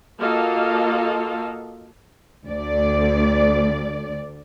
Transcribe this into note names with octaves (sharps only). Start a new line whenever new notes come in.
A#3 F4 F#4 A4 D#5 F5
D2 D5